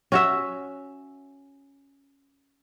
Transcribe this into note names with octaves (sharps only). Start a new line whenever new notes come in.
C#4 F#4 E5